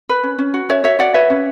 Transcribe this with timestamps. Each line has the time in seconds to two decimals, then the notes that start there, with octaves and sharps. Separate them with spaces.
0.09 B4
0.23 C#4
0.39 C#4
0.54 F#4
0.69 C#4 C#5 E5
0.84 F#4 C#5 E5
0.99 F#4 D5 F#5
1.14 B4 C#5 E5
1.30 C#4